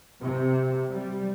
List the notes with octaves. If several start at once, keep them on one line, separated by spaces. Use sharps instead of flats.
C3
G3